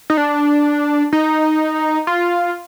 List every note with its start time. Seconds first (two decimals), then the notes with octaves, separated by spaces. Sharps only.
0.10 D#4
0.17 D4
1.13 D#4
2.07 F4